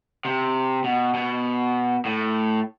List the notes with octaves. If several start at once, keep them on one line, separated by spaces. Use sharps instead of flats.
C3
B2
B2
A2